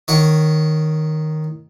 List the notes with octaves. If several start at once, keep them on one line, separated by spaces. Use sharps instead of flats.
D#3 C#5 F#5 D6